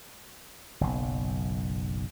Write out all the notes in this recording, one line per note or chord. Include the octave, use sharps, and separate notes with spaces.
F#1 B1